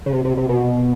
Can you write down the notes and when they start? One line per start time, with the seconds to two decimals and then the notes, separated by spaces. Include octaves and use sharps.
0.06 C#3
0.12 C3
0.25 C3
0.37 C3
0.49 B2